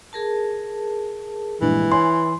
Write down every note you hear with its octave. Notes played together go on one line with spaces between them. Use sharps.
G#4 A#4 A5
A#1 G2 E3 G#3
C#5 E5 G#5 C6